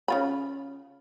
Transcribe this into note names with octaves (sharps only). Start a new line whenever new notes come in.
C#3 F4 B5